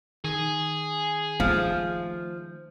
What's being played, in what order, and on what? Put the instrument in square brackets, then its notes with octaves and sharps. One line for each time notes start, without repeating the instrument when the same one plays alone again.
[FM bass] D#3 [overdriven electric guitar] G#4
[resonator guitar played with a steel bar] F3 [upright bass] A3